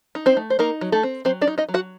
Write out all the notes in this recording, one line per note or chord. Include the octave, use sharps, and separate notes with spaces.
D#4
C4 C5
A3
C5
A#3 D#4 A#4
F#3
A3 A4
C4
F#3 C4 C5
D4 D5
D#4
D#4 D#5
F#3
F#4 F#5